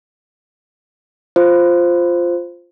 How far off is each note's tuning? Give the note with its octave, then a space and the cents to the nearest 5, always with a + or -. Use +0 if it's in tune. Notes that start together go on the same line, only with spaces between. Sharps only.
F4 +0 C5 +0